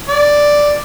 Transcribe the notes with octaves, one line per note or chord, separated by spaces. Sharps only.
D5